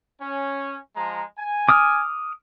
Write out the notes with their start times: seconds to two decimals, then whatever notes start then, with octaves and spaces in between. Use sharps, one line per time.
0.21 C#4
0.95 F3 G#3 A#5
1.38 G#5
1.69 D6 D#6 F6